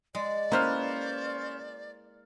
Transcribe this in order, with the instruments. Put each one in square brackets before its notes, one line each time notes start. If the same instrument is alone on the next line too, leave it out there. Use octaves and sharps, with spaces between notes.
[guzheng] G#3 [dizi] D5
[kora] A#3 [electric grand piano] C#4 C5 F6 [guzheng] E4 B4